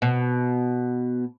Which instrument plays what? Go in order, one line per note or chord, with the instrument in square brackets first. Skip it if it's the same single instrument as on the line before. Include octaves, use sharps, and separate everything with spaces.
[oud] B2